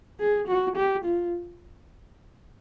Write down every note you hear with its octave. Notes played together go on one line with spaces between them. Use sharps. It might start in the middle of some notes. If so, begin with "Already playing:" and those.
G#4
F#4
G4
F4